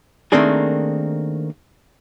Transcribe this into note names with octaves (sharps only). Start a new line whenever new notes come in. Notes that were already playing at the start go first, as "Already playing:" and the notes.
D#3 A3 A#3 C4 D4 G#4